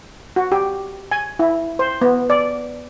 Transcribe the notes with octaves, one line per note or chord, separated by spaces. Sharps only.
F#4
G4
G#5
E4
C5
B3
D5